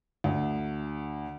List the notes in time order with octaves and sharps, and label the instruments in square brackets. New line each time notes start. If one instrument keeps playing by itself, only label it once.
[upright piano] D2